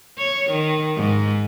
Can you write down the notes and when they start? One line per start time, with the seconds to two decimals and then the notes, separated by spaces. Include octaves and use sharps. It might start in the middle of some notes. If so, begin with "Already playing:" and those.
0.18 C#5
0.51 D#3
0.97 G#2